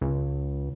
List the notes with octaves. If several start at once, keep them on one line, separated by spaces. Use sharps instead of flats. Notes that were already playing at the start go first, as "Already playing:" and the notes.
C#2